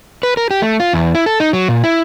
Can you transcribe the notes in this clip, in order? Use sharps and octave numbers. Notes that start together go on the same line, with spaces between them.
B4
A#4
G4
A3
F4
E2
E4
A4
D#4
F#3
A#2
E4